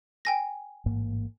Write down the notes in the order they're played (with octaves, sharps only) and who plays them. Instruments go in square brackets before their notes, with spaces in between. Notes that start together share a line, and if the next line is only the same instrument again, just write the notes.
[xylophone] G5 G#5 A#6
[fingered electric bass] A1 G#2 A#3